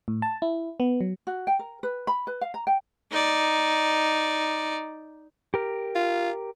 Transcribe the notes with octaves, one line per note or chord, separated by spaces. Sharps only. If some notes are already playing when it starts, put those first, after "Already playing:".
A2
A5
E4
B3
F#3
F#4
G5
A#4
B4
B5
B4
F5
A#5
G5
D#4 D5
G4 A#4
F4